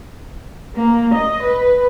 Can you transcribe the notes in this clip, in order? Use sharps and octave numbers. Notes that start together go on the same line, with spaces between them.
A#3
D#5
B4